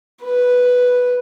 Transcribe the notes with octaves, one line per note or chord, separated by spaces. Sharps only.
B4